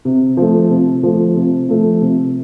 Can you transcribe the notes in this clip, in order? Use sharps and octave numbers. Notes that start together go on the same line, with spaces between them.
C3
F3 A3
C3
F3 A3
C3
F3 A3
C3